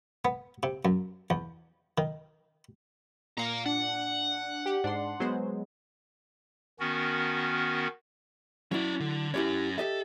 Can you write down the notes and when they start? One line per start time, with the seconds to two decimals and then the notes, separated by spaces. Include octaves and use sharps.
0.25 B3
0.63 C3
0.85 F#2
1.30 E2
1.98 D#3
3.37 A#2 F5 A#5 C#7
3.66 D4 F#5
4.66 G4
4.84 G#2 D4 C6
5.20 F#3 G#3 B3 C5
6.80 D#3 B3 C#4 F#4 A#4
8.72 F#3 C#4 E4 D5
9.00 D3
9.34 F#3 C#4 E4 G4 C#5
9.78 G4 A4 D#5 E5